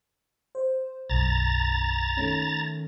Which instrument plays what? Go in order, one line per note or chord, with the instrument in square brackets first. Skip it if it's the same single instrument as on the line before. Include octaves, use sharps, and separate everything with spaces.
[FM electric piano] C5
[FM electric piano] B1 F#2 [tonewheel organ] A#5 A6
[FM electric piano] D#3 A3 C#4